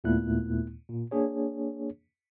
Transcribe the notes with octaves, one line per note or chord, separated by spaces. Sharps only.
D#2 A#2 A3 B3 E4 F#6
A#2
A#3 D4 G#4 C#5